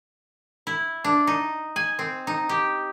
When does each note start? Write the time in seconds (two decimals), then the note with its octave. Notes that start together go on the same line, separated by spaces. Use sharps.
0.67 E4
1.04 D4
1.27 D#4
1.76 G#5
1.99 C4
2.27 D#4
2.49 G4